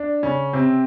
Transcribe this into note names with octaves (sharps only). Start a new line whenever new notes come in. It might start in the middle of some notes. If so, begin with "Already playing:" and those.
Already playing: D4
C#3 C#4
C3 C4